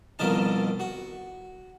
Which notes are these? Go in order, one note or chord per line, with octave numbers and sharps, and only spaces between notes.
C2 F2 B2 D#3 A#4 A5
F#4